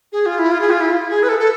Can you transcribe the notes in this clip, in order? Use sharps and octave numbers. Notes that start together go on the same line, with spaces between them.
G#4
F4
E4
F4
G#4
F4
E4
G#4
B4
A4
A4